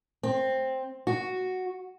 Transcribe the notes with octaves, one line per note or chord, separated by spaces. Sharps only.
C4
F#4